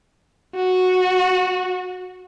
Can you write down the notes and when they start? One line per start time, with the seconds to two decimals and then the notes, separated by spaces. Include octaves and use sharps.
0.56 F#4